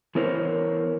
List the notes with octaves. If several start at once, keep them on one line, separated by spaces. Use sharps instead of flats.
E3 B3 E4 A#4 C5 C#5